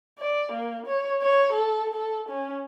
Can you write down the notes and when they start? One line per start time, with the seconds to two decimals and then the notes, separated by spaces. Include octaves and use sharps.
0.19 D5
0.52 A#3
0.87 C#5
1.22 C#5
1.53 A4
1.94 A4
2.29 C#4